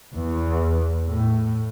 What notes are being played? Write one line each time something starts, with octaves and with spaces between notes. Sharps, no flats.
E2
A2